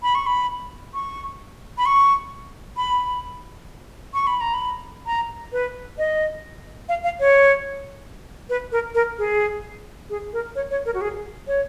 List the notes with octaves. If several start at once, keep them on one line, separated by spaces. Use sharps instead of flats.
B5
C#6
B5
C#6
B5
C#6
B5
C#6
B5
A#5
B5
A#5
B4
D#5
F5
F5
C#5
B4
A#4
A#4
G#4
G#4
A#4
C#5
C#5
A#4
F#4
G#4
C#5